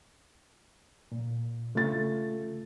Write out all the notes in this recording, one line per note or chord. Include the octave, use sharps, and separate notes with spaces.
A#2
C#3 A3 F4 A6